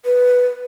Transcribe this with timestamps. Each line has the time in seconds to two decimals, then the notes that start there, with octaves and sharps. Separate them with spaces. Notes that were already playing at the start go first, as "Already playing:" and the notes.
0.05 B4